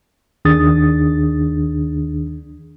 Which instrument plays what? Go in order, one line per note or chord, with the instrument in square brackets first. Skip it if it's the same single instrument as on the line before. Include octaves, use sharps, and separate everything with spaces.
[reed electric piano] D#2 D#3 D4 G#4 D#6 A6